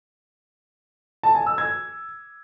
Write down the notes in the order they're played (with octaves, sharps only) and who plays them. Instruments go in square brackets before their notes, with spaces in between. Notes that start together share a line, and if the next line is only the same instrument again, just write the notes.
[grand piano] A5
G#5
E6
G#6